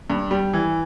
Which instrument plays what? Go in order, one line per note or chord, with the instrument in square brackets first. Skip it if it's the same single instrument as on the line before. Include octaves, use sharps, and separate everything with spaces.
[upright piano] G2
G3
E3